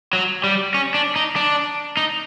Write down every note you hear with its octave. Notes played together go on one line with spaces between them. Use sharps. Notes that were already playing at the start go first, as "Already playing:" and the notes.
F#3
G3
C#4
D4
D#4
D4
D#4